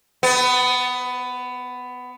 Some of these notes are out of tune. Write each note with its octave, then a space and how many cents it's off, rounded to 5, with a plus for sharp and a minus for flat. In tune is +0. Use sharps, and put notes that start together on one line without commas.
B3 +15